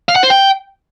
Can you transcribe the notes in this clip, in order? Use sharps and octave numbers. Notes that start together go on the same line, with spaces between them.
F5
F#5
C5
G5